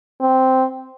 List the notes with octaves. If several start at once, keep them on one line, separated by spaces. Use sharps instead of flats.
C4